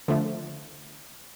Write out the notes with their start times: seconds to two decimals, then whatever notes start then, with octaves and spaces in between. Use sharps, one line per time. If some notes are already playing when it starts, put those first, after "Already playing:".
0.08 D3 F3 A3